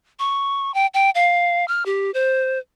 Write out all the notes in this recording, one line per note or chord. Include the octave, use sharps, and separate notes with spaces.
C#6
G5
G5
F5
F6
G4
C5